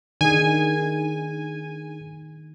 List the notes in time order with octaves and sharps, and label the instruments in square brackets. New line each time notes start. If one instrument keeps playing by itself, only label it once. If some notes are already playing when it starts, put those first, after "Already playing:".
[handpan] D#3 [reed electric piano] D4 D#4 G#4 [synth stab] G#5